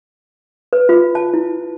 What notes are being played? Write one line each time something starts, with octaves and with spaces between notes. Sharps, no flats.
B4
F4
A5
E4